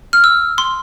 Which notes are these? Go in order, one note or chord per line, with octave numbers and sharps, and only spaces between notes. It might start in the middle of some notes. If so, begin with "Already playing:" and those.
F6
E6
C6